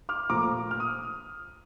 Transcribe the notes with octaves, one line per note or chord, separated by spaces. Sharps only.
D6 F6
A#2 F3 A3 A#5 D6
F6
D#6